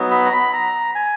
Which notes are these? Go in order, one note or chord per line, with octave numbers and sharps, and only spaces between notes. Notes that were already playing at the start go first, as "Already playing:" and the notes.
Already playing: F#3 B3 D#4 F#4
B5
A#5
B5
A#5
G#5